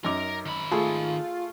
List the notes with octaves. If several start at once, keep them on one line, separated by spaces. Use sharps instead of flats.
F#2 D#4 A#4 D6
D#3 B5
A3 F4 G#4 A4